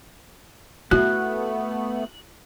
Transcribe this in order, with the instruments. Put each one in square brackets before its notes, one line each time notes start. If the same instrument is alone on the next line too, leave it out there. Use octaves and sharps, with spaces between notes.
[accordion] A3 B3 [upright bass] E4 [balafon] F#4 [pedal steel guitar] F#6